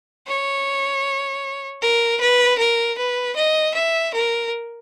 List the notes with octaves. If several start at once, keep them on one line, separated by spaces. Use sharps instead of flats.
C#5
A#4
B4
A#4
B4
D#5
E5
A#4